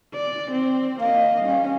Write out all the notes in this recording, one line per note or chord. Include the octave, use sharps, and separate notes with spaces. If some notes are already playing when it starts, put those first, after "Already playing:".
D5
C4
A#3 D#5 F5
G3 C#4